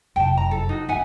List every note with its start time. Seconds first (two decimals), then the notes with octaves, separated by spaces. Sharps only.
0.16 F1 F#2 G5 A5
0.37 A#5
0.51 A4
0.69 D#4 F#4
0.89 D2 G3 E5 F#5 G#5